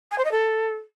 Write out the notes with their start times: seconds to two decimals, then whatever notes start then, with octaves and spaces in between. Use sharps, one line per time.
0.11 G#5
0.18 C5
0.24 D#5
0.31 A4